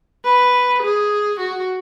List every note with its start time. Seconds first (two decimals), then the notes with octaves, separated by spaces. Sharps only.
0.25 B4
0.82 G#4
1.39 F#4